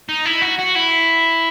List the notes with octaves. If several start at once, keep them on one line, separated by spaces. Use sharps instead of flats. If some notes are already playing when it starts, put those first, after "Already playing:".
D#4
E4
F#4
F#4
E4